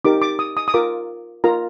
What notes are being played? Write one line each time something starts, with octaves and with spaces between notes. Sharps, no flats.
D#4 G4 A#4 D6
D6
D#6
D#6
D#6
F4 A#4 D6
F4 A#4 A#5